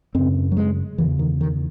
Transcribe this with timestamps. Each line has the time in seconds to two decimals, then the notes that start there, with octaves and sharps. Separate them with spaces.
0.15 F#2 C#3 C4
0.52 F#3
0.57 G#3
0.98 E2 C#3 E3
1.19 D#3
1.41 D#3